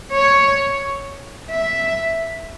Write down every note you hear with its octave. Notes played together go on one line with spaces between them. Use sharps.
C#5
E5